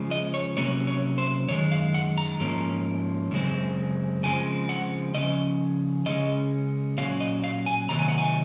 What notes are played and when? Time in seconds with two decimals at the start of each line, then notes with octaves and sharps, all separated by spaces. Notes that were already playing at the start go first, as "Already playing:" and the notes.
Already playing: C#3 F3 G#3
0.11 D#5
0.34 C#5
0.57 C3 F#3 A#3 C#4 C#5
0.87 C#5
1.18 C5
1.49 F#2 D#3 G#3 C#5
1.71 F5
1.94 F#5
2.18 A#5
2.40 G#2 F3 A#3 C#4
3.31 F#2 C#3 G#3 C4
4.23 C#3 F3 G#3 C4 G#5
4.69 F#5
5.14 C#3 F3 C#4 D#5
6.06 C#3 G#3 C#4 D#5
6.98 A#2 F#3 C#4 F5
7.20 D#5
7.44 F5
7.66 G#5
7.89 C3 D#3 F#3 A#3 A#5
7.99 G#5
8.09 F#5
8.18 G#5